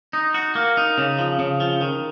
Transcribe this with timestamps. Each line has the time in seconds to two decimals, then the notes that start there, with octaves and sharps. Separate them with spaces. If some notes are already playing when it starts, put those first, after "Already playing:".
0.13 D#4
0.34 F#4
0.55 A#3
0.77 D#4
0.98 C#3
1.19 F3
1.39 C#3
1.60 F3
1.81 D#3